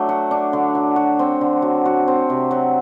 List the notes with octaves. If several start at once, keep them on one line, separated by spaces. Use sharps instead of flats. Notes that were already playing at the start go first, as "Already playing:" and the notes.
Already playing: F#3 A3 D4
F#4
D4
D3
F#3
F#4
C4
D3
F#3
F#4
C4
C3
F#3